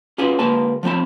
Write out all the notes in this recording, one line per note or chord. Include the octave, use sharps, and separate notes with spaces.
C#4 F4 F#4 G#4 B4
D2 G#3 A#3 B4 A5
F3 A3 C4 A5 B5